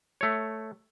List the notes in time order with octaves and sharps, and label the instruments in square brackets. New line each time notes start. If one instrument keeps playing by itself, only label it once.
[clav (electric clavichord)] A3 C#5